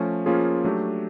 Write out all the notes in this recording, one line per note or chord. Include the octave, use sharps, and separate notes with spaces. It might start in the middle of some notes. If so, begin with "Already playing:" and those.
Already playing: F3 A3 C#4
F3 A#3 C#4 F4 G#4
F#3 A3 D4 G4